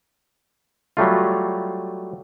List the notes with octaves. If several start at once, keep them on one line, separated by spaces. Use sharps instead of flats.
F#3 G3 A3 F4